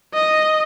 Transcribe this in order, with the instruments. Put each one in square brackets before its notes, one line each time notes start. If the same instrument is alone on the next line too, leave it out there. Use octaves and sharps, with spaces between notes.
[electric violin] D#5